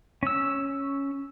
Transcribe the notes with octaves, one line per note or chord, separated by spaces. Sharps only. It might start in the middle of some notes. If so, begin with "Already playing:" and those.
C#4 E6